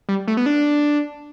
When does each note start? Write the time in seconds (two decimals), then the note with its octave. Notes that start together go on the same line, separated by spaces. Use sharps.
0.09 G3
0.28 A3
0.37 B3
0.46 D4